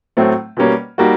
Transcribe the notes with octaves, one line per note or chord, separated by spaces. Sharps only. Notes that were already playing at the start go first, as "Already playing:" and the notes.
A2 F#3 A3 C4
B2 G3 A#3 C#4
G3 A#3 D#4 F#4